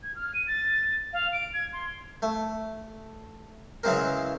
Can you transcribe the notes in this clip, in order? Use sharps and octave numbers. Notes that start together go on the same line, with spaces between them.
G#6
F6
D#7
A6
F5
D7
G#6
C6
A3
C#3 E3 F#3 G#3 C4 A#4